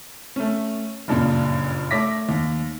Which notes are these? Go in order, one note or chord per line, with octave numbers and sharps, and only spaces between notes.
A3 C#4
F#1 G2 A#2 C#3
A3 C#5 D6 A#6 B6
D#2